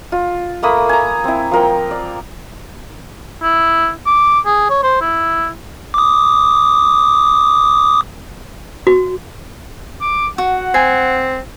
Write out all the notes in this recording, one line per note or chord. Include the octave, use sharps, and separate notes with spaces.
F4
A3 A#3 B5 D#6
G#5 A#5
C4 E4
F3 A#4 G5
D5
E4
D6
G#4
C#5
C5
E4
D6 D#6
F#4
D6
F#4 F#5
C4 G#5